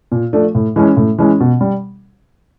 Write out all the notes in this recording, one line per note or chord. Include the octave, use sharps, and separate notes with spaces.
A#2
F3 A3 D4
A2
E3 G#3 C#4
A2
E3 G#3 C#4
B2
G3